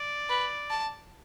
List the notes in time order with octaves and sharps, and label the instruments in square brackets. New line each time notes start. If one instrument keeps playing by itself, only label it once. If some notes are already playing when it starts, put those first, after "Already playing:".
Already playing: [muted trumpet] D5
[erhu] B4
A5